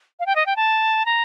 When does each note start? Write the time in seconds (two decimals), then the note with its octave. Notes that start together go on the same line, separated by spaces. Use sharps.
0.20 F5
0.26 G5
0.36 D#5
0.46 G5
0.56 A5
1.06 A#5